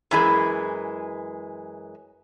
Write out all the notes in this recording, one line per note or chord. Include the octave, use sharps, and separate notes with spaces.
F#2 E3 G#3